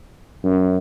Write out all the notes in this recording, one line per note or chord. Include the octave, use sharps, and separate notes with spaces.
F#2